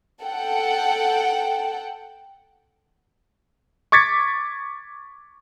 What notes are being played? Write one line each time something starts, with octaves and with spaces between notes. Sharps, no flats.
A4 F#5 G5
C#6 D6 G#6 A6 B6 C#7